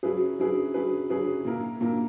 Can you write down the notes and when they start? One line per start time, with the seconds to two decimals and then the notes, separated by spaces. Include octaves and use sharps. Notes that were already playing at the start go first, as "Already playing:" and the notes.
0.03 F#3 C#4 E4 G#4 B4
0.39 F#3 C#4 E4 G#4 B4
0.74 F#3 C#4 E4 G#4 B4
1.09 F#3 C#4 E4 G#4 B4
1.45 A#2 A#3 E4 A#4
1.81 A#2 A#3 E4 A#4